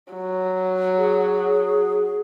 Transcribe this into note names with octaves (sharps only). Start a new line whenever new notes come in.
F#3
G#4